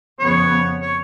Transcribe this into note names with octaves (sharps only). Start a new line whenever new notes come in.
F2 C#3 F3 B3 C#5
C#5